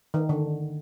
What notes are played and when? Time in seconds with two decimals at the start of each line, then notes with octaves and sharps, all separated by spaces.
0.14 D#3
0.29 D3